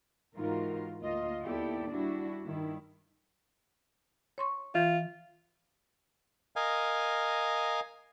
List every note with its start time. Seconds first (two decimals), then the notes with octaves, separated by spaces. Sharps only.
0.36 G#2 E3 D#4 F4 F#4 A#4
1.01 D2 A#3 F4 D#5
1.43 D#2 B3 E4 G4 A4 D5
1.90 G3 D4 E4 F#4
2.46 G2 D#3 E4
4.38 C#5 C6 C#6
4.75 E3 F4
6.56 A#4 D#5 F5 G#5